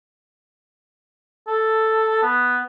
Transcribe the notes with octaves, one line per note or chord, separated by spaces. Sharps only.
A4
B3